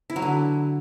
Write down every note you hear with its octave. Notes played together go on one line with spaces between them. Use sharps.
E4
F#3
D3